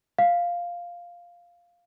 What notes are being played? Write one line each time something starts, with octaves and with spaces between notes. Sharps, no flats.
F5